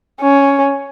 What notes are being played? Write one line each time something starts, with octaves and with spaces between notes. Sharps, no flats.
C#4